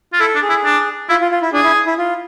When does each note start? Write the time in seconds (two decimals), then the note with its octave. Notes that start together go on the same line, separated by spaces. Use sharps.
0.13 F4
0.20 E4 A4
0.35 D4
0.42 G#4
0.49 E4
0.65 D4
1.09 E4 F4
1.21 F4
1.31 F4
1.42 E4
1.53 D4 G#4
1.64 E4
1.87 E4
1.98 F4